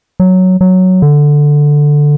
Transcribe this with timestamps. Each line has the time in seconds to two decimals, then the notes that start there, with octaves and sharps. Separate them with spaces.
0.20 F#3
0.61 F#3
1.02 D3